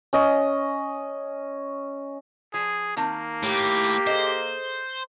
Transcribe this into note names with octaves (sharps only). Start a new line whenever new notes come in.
C#4 D#5
F3 G#4
D#3 A#3 C4 A5
A2 G4
G#4 A4 C5 D#5